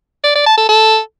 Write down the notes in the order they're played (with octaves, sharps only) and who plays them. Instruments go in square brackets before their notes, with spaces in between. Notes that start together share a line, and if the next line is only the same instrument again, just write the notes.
[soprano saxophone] D5
D5
A5
A4
A4